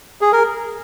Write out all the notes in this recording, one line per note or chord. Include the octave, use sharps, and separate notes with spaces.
G#4
A#4